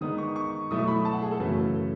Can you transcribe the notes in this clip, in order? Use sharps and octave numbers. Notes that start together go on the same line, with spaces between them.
D#3 G#3 B3 D#4 D#6
C#6
C#6
B2 F#3 A3 E4 D#6
C#6
B5
A5
F#5
G#4
A4
F#2 C#3 E3 A3 C#4 B4
A4
A4